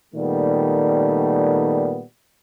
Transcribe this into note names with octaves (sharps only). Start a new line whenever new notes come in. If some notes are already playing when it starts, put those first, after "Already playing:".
A#2 D#3 G3 A3 B3